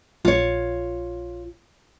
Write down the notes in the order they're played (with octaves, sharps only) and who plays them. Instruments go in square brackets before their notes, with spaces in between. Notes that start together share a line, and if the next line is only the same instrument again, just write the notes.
[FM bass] A#1 [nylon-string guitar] F4 C#5